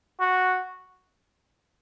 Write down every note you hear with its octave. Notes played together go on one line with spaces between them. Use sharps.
F#4